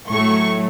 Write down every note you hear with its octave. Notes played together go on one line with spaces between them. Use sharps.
A2 F#3 A3 C#6